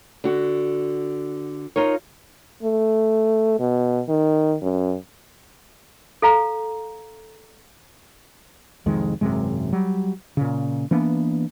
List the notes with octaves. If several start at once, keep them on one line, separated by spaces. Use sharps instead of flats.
D3 F#4
D#4 F4 A#4 C#5
A3
B2
D#3
F#2
A4 F5 A#5
C2 F2 D#3 G#3
G#1 F#2 C3 G#3
F#3 G3
A#2 C#3
E3 A#3 B3 D4